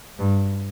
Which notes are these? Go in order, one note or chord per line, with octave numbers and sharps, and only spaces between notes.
G2